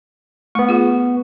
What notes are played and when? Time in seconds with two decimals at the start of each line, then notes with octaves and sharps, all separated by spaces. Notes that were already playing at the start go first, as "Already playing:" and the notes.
0.55 A3 B3 C#6
0.69 F4 G#4